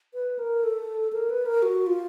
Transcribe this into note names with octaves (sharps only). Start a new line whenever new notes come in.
B4
A#4
A4
A#4
B4
A#4
F#4
F4